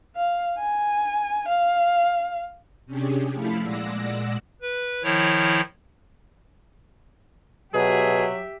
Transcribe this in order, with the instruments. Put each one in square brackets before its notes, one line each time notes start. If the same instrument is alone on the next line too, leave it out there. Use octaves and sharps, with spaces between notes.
[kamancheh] F5
G#5
F5
[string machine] C3 C#4 D4 G4 G#4
F3 A3 E4 A4 F5 B5
A#2 G#3 D5 F#5 E6 A#6
[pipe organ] B4
D#3 F3 E4 C#5
[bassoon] B2 [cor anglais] F#3 [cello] G4 E5 [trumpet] G#4